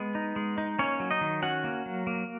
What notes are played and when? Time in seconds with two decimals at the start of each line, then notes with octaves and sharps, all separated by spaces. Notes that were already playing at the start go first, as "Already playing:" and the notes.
Already playing: G#3 B3
0.15 D#4
0.36 G#3
0.58 D#4
0.79 A#3 C#4 C#5
1.00 F#3
1.11 D#4 D#5
1.21 D#3
1.42 C#4 F#4 F#5
1.64 A#3
1.86 F#3
2.07 A#3